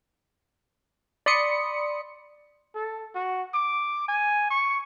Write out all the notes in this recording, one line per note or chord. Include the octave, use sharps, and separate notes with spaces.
D5 B5 C6 D#6 C#7
A4
F#4
D6
G#5
C#6